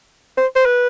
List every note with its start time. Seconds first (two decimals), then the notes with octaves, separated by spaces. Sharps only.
0.38 C5
0.56 C5
0.66 B4